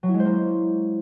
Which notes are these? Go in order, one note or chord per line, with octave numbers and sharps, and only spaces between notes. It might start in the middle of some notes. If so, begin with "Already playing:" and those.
F#3
E4
G#3
C5
A#3